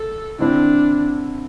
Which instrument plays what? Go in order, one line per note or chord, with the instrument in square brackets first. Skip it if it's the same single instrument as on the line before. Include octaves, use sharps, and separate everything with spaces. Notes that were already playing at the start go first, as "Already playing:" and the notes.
Already playing: [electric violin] A4
[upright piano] D3 C4 E4 [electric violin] D4